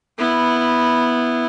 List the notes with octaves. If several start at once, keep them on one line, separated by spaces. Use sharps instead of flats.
B3 E4